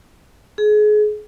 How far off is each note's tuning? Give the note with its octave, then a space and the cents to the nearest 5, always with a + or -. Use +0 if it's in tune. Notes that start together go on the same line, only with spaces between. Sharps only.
G#4 +30